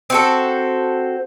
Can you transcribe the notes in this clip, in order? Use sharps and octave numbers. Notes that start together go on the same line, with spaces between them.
C4 F#4 A4